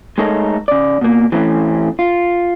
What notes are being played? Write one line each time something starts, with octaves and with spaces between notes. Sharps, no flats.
G#3 A3 D#4 A4 A#4 C#5
C#3 D5
B2 A#3
E3 A3 C4 C#4
F4